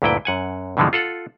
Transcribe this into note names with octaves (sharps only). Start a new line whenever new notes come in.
D2 G2 A#2 E4 B4 G5
F#2 F#5 G#5
G2 B2 D3 E3 F3 G#3
F4 A4 F#5